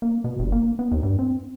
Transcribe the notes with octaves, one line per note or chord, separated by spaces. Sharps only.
A#3
B2
G1
A#3
B3
D#2
G2
C4